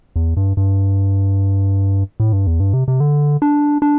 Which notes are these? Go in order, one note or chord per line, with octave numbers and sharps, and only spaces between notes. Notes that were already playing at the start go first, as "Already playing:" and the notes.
E2
G2
G2
A2
G2
E2
G2
C3
C3
D3
D4
D4